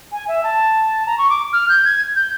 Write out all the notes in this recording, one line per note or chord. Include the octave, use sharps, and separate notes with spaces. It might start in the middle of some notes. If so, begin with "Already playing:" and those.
G#5
E5
A5
A#5
C#6
D6
F6
G6
G#6
G6